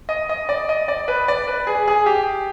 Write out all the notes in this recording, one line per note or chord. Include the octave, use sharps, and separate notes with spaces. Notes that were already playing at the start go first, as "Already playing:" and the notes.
D#5
D#5
D5
D#5
D5
B4
D5
B4
G#4
G#4
G4